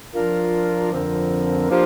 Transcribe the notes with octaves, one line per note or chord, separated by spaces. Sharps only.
F3 D4 F4 A#4
F2 D3 F3 C4 A#4
F3 A#3 D4 G4 C5